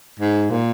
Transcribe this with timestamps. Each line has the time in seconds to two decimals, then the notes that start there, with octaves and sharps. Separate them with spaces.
0.20 G#2
0.50 A#2